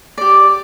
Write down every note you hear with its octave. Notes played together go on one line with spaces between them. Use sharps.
G4 D5